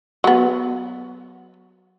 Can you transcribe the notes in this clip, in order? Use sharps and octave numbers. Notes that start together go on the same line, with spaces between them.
F#3 B3